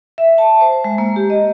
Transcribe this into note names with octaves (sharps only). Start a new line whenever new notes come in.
E5
A5
C5
G#3
A#3
G4
D#5